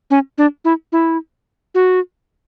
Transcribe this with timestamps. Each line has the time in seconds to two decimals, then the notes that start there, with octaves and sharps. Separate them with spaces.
0.10 C#4
0.38 D4
0.65 E4
0.92 E4
1.75 F#4